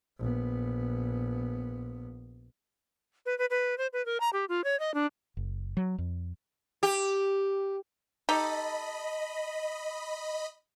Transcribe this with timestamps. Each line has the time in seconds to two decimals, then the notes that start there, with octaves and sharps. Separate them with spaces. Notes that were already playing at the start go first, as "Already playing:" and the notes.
0.19 A#1 B3
3.26 B4
3.39 B4
3.50 B4
3.78 C5
3.93 B4
4.06 A#4
4.20 A#5
4.33 G4
4.49 F4
4.64 C#5
4.80 D#5
4.94 D4
5.37 F#1
5.77 F#3
5.98 F2
6.83 G4
8.29 D#4 G4 A4 D#5 B5